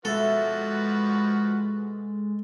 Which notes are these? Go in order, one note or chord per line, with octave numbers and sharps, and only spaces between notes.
B2 F3 G#3 F#4 A4 B4 E5